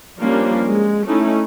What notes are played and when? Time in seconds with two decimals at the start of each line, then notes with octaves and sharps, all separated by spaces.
0.19 F3 G3 A#3 C#4 D4
0.68 G#3
1.06 A3 C#4 D#4 E4